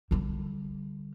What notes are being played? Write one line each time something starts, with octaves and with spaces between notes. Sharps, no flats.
D3 G3